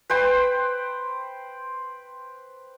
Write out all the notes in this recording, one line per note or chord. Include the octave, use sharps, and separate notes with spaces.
B4 C5 G5